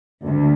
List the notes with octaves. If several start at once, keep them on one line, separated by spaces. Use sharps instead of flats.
D2